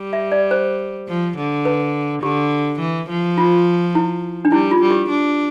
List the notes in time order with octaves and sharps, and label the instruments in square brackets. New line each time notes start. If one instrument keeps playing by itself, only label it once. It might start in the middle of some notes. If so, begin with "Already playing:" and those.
Already playing: [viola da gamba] G3
[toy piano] E5
D5
C5
[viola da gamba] F3
D3
[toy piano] B4
[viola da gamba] D3 [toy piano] G4
[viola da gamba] E3
F3
[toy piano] F4
E4
D4
[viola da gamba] G3 [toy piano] E4
[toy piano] F4
[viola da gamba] G3
[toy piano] G4
[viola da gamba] D4